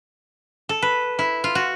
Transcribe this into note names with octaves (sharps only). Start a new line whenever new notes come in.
A4
B4
E4
F4
F#4